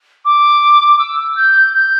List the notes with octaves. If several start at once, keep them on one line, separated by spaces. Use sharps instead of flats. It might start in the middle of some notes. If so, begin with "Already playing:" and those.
D6
E6
G6
G6